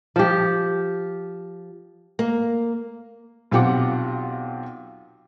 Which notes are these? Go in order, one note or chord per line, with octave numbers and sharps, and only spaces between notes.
F3 G4
A#3
B1 C4 F4 G4 F#5 D6